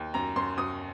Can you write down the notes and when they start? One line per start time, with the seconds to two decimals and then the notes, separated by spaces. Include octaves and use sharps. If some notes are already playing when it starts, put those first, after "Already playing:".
Already playing: D#2
0.14 F#2 A#5
0.36 F#2 C6
0.58 F#2 D#6